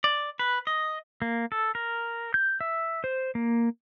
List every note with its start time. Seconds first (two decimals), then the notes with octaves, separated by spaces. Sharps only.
0.04 D5
0.39 B4
0.67 D#5
1.22 A#3
1.52 A4
1.75 A#4
2.34 G6
2.61 E5
3.04 C5
3.35 A#3